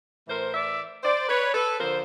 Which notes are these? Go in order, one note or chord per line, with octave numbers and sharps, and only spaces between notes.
A2 E3 A#4 C5
D5 E5
C5 D5
B4 C#5
A4 B4
D3 F3 A#4 C5